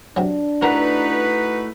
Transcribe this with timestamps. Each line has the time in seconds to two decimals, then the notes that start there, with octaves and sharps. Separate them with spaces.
0.16 C3 F#3 D4
0.62 A3 D#4 E4 F#4 A#4 B4 F#5 A#5